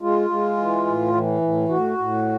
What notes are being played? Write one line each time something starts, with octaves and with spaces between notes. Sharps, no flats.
G#3 F4
G#3
E3
A2
E3
A2
A2 F#4
A2